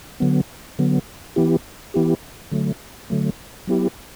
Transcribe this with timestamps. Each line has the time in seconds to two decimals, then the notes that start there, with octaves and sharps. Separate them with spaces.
0.20 D3 F#3 B3
0.79 D3 F#3 B3
1.36 E3 B3 E4 G4
1.94 E3 B3 E4 G4
2.51 D3 F#3 A3
3.10 D3 F#3 A3
3.67 F#3 B3 E4 G4